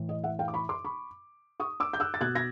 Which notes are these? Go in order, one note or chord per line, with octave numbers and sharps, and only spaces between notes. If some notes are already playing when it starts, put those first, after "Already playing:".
Already playing: A2 E3
D#5
E5 F#5
F5 G5
D6
B5 C#6
C6 D6
B5 C#6
C#6 D#6
D6 E6
G6
E6 F#6
A6
B2 F#6 G#6
G#6 A#6